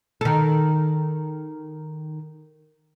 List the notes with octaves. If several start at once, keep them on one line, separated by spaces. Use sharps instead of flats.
D#3 A4